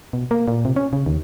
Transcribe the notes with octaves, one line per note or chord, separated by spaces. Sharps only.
B2
A#3
A#2
C3
C#4
C#3
D#2